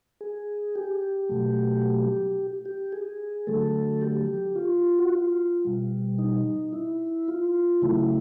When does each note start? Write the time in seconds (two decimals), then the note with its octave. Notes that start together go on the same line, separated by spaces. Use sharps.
0.21 G#4
0.76 G4
1.29 B2 F#3 A3
2.65 G4
2.92 G#4
3.47 D3 F#3 A3 A4
4.01 G4
4.55 F4
4.99 F#4
5.10 F4
5.65 B2 G3
6.18 D#4
6.73 E4
7.28 F4
7.82 C#3 F#3 A3 E4